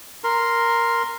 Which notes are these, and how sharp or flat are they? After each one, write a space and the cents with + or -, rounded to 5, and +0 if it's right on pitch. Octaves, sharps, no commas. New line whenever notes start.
A#4 +0 C6 +0